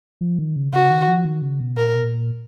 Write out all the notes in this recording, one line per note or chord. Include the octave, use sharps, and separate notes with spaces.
F3
D#3
C#3
C#3 F#4
D#3
F3
D#3
C#3
B2
A#2 A#4
B2
A#2